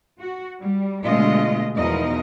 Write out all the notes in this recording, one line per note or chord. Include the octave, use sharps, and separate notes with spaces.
F#4
G3
B2 D3 G#3 A3 F4 D#5
E2 B2 F3 D#4 A#4 D#5